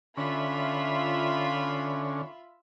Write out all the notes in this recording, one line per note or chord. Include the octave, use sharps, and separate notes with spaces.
D3 C#4 F4 E5 B5